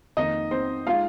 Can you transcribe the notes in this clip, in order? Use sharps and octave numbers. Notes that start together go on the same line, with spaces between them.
F2 D#3 A#3 D#4 D#5
C4 C5
G#3 D#4 F4 F5